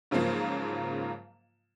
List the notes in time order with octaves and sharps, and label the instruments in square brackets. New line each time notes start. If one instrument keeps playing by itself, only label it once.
[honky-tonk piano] G#2 C#3 F3 F#3 A#3 F4